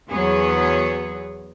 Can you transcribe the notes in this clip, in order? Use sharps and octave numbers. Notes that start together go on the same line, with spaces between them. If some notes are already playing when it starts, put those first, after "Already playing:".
E2 F#3 B3 G#4 C#5